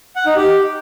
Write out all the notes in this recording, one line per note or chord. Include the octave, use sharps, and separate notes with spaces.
F#5
D#4
G4